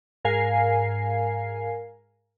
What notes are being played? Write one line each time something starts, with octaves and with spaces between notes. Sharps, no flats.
G#2 A#4 F5 G#5 C7